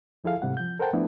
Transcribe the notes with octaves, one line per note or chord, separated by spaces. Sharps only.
D2 F3 E4 G#4 A4 F5
G#2 C3 G3 F#5
F3 G6
A4 A#4 C5 F#5 G5 A5
F3 A3 B3 D4 E4